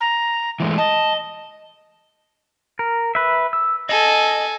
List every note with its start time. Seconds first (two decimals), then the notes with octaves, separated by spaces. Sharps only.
0.01 A#5
0.60 E3 G#3 A3
0.78 D#5 A5
2.79 A#4
3.15 B4 E5
3.53 E6
3.89 A4 D#5 G#5